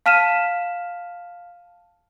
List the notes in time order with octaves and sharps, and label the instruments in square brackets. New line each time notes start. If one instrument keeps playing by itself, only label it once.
[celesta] F5 A5 F6 B6 D#7 E7